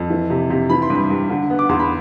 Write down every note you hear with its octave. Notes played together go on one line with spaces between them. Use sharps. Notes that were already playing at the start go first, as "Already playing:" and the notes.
Already playing: F2
E3
C3
C3
E3 B5
C6
G2
B5
G2
D3
B3
D6
E2 C6
B5